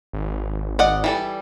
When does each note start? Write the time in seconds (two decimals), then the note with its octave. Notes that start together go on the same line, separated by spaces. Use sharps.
0.13 G#1
0.79 D5 D#5 F#5
1.04 E3 G3 A4